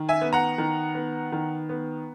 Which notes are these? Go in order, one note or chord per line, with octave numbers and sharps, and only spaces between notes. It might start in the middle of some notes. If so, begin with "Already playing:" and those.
Already playing: D#3
E5 G#5
B3
F#5 A#5
D#3
B3
D#3
B3